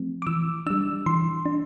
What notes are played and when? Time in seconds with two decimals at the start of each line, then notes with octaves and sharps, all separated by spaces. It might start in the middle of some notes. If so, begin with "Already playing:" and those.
Already playing: F3 A3 C4
0.22 D6
0.27 E3 E6
0.67 G3 D4 E6
1.06 E3 C6
1.46 D4